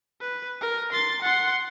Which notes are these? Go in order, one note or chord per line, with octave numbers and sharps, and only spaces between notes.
B4
A#4
C6 A6
F#5 C6